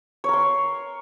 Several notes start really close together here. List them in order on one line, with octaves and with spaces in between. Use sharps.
C#5 A#4 C6